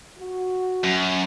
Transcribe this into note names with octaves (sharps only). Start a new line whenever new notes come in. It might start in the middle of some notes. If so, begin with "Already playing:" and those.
F#4
F#2